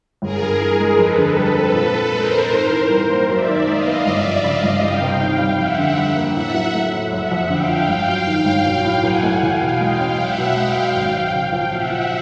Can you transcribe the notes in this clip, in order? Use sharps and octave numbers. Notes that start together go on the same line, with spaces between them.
G1 G#4 A#4
G2
E3
G#3
F2 A4 B4
D3
G3
C4
A#2
F3
G#3 A#4 C5
C4
G#2
E3
G3 A#4 C5
A#3
F#2 D5 E5
D#3
G#3 D#5 F5
B3
G1 D5 E5
F2
C#3 D#5 F5
G1
C2 F5 G5
C3
D#3
G3
F2 E5 F#5
D3
G3
A#3
A2 E5 F#5
F#3
A3
A2
F#1 E5 F#5
F2
D3 F5 G5
F3
G1
F#2
D#3 F5 G5
G1
B1
A2
F#3 F#5 G#5
A3
E2 F5 G5
B2
G#3 F5 G5
C#4
B1 E5 F#5
B2
G#3 F5 G5
B1
G#1
F#2
C#3 F5 G5
F3
A#2 E5 F#5
F3